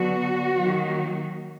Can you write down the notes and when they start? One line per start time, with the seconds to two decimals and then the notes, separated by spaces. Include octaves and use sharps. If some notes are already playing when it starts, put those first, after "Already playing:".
Already playing: D3 F#3 B3 F#4
0.55 D#3 F#3 A#3